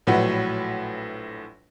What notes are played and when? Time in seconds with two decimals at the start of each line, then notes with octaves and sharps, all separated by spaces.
0.07 A#1 A2 F#3 B4 F#5